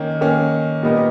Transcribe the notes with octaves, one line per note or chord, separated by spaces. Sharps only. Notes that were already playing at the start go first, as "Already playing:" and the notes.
Already playing: D#3 A#3 C#4
D#3 A#3 C#4
A#2 G3 B3 D#4 A#4